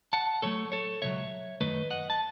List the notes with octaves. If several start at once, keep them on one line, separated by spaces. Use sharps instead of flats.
F#5 A5
A2 F#3 A3 A4 C#5
A4 C#5
C#2 B2 F#3 C#5 E5
F#2 D#3 A3 B4 D#5
D#5 F#5
A5